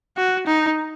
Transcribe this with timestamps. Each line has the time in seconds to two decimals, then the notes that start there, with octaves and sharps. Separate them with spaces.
0.17 F#4
0.46 D#4